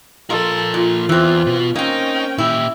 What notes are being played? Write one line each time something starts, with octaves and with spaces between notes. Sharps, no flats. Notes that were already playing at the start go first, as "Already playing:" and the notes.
F3 F4 A4 A#4
A#2 F4
E2 E3 C4
B2 B3
A#3 C4 C#4 D#4 G5
A#2 E4 G4